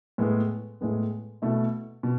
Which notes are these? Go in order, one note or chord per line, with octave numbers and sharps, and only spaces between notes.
A2 G#3 B3
A2 G#3 B3
B2 A3 E4
B2